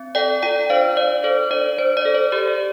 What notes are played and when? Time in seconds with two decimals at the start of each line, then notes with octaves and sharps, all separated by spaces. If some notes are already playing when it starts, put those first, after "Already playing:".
Already playing: C4
0.15 A4 D5 G5
0.43 F4 D5 G5
0.70 D4 C5 F5
0.97 D4 D5
1.24 A4 C5
1.51 D4 D5
1.78 D4 C5
1.97 D5
2.05 A4
2.14 C5
2.32 G4 D5
2.48 D5